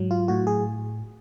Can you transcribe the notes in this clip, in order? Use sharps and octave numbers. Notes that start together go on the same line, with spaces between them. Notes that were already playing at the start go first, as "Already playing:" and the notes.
Already playing: G#2 F#3
F4
A2 F#4
G#4